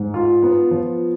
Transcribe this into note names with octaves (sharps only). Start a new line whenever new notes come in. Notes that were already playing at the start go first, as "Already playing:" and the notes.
Already playing: G#2
F4
B3
F3